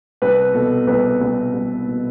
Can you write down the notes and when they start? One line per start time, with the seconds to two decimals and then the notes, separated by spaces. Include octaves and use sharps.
0.22 C2 B4
0.54 B2 A4
0.87 C2 B4
1.21 C2
1.53 C2
1.87 B2